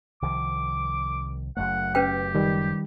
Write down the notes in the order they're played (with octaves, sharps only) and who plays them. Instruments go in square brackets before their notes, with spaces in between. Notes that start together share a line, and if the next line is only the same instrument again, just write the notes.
[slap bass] C2 D#3 F3 [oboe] D6
[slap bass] F#1 F#2 A3 [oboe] F#5
[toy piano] C#4 B4 G5 [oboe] G4
[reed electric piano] D#3 G3